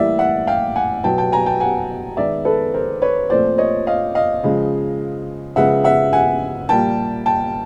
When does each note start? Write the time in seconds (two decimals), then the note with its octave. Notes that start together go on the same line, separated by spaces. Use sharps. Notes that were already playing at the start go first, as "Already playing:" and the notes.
Already playing: A2 E3 G3 A#3 D5 E5
0.19 E5 F#5
0.47 F5 G5
0.76 F#5 G#5
1.04 B2 F#3 B3 G5 A5
1.18 G5 A5
1.32 G#5 A#5
1.46 G5 A5
1.60 F#5 G#5
2.17 D#3 G#3 B3 D5 E5
2.45 A4 B4
2.74 A#4 C5
3.02 B4 C#5
3.30 A#2 F3 A3 C4 C5 D5
3.58 C#5 D#5
3.87 D#5 F5
4.15 D#5 F5
4.43 C#3 F3 G#3
5.56 C#3 F3 G#3 B3 E5 F#5
5.84 E5 F#5
6.13 F#5 G#5
6.69 A#2 G3 A#3 G5 A5
7.26 G5 A5